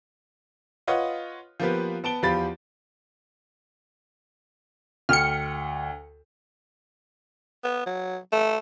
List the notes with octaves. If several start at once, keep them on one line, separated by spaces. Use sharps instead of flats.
F4 B4 C#5 D#5 F#5
F3 A#3 B3 G4 B4
B3 A5 D7 G7
E2 F3 G4 F5 B5 A6
D2 G5 F6 C#7
B3
F#3
A3